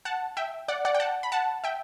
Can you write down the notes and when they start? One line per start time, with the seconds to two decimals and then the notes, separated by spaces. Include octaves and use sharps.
0.05 F#5 A5
0.37 E5 G5
0.68 D5 F#5
0.85 D5 F#5
0.94 G5
1.00 F#5 A5
1.23 B5
1.32 F#5 A5
1.64 E5 G5